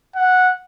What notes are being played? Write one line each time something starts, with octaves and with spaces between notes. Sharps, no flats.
F#5